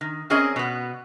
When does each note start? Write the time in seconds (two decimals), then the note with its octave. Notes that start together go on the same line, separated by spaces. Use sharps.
0.01 D#3
0.30 C4 C#4 G#4 A#4 D5 D#5
0.56 B2 B3